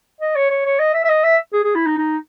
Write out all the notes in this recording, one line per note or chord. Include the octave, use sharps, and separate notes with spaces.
D#5
C#5
C#5
C#5
D#5
E5
E5
D#5
E5
G#4
G#4
E4
D#4
D#4